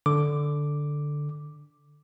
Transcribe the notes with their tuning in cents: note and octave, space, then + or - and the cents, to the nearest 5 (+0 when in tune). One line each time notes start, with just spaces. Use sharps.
D3 +0 D6 +0